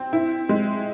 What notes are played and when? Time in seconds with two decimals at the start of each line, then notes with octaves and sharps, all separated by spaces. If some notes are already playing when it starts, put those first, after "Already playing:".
Already playing: C4
0.13 E4
0.49 G#3